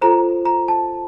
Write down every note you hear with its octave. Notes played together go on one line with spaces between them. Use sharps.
F4 A4 C5 A#5
A#5
A5